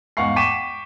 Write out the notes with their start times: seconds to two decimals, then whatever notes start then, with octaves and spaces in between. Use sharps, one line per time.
0.17 E2 G#2 F5 F#5 C#6 C7
0.36 G5 C#6 D6 B6 D#7 E7